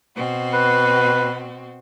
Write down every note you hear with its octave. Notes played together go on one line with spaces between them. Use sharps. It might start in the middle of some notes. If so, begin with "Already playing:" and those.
B2 C4 F#4
B4